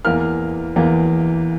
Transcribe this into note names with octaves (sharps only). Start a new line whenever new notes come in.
E2 E3 A#3 F6
E2 E3 A#3